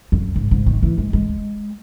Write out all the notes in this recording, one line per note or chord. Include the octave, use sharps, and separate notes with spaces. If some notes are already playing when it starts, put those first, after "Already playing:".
F#2
G#2
G#2
D#3
E3
G#3
G#3